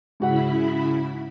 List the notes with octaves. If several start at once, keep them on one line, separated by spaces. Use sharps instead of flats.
G#2 C#3 E4 F#4 F#5 B5